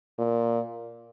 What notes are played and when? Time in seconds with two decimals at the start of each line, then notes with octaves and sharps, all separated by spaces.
0.19 A#2